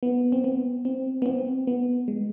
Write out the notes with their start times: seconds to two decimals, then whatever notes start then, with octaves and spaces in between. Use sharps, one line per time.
0.03 B3
0.32 C4
0.44 B3
0.85 C4
1.22 B3
1.26 C4
1.67 B3
2.08 G#3